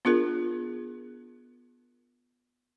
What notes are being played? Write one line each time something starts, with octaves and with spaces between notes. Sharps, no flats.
B3 D4 F4 G#4 A#4